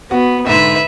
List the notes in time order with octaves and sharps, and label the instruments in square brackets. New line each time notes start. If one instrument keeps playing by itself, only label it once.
[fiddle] B3 [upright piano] F#4
[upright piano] G#2 D3 [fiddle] B4 E5